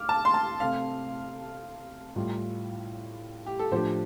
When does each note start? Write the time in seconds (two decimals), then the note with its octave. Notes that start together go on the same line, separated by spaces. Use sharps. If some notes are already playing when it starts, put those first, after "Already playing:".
Already playing: D6 F6
0.09 A5
0.25 C6
0.34 A5
0.60 C3 A3 C4 F5
2.16 A2 G3 F4
3.46 G4
3.59 A4
3.71 A2 F3 D4 G4 C5